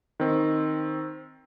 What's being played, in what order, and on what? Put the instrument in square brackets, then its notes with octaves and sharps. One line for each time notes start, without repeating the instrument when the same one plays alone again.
[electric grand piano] D#3 C4